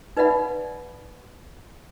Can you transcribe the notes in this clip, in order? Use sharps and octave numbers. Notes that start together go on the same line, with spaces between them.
D#4 B4 D5 E5 F#5 B5